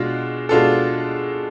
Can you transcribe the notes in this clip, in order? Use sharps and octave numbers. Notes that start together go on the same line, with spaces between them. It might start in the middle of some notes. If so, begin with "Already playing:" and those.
Already playing: B2 G#3 D4 F4
B2 G#3 D4 F4 A4